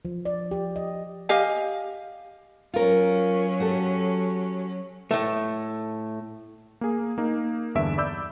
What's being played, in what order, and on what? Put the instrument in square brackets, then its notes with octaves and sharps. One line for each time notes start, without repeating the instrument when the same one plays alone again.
[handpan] F3
D5
G4
D#5
[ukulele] G4 D#5 F5 G#5
[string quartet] F#3 C#4 [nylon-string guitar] F4 A#4
[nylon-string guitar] F#4 G4 A4
[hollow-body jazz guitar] A2 A3
[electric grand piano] A#3 G#4
A#3 D#4
E2 G2 D3 E5 D7
D5 B5 D6 E6 G6